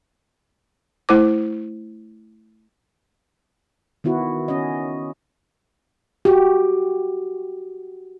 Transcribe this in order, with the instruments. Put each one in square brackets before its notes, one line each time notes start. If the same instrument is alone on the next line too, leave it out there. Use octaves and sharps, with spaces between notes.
[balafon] A3 E4 C5 D6
[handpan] D#3 B3 E4 F#4
C#4 D#5
F#4 G4